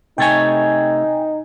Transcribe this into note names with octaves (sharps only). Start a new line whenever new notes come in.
C3 A3 D#4 C#5 G5 G#5